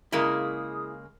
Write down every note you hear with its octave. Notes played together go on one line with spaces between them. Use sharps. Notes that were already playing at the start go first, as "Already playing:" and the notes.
C#3 G#3 A#3 E4 A#4 F5 D#6